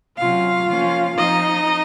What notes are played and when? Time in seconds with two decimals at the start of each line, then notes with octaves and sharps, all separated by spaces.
0.17 C3 F#3 C#4 F4 F5
0.67 F3 A#3 C#4
1.17 F3 C4 D#4 D#5